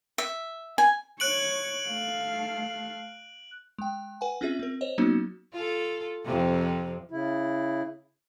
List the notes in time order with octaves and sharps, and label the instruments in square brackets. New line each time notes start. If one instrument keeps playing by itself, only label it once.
[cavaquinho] E5
G#5
[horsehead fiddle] C#5 [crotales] F#6 D7 F#7
[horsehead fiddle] A3 F5
[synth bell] G#3 G5
B4 F#5 G#5
C4 C#4 F4 G#4 E5
C4 A#4
C5 C#5 D#5
F#3 A#3 B3 C#4 D#4 F#4
[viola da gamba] F4 A4
F2 C3
[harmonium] C#3 E4